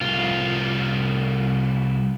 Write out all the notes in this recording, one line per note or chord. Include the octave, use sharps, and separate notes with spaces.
C2 F4